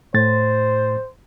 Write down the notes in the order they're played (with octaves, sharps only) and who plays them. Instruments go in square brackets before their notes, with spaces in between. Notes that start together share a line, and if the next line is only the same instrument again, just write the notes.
[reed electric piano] A2 A6 [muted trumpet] C5